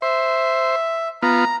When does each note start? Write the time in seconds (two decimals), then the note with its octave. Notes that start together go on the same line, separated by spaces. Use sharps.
0.02 C5 E5
1.23 B3 F4 A#5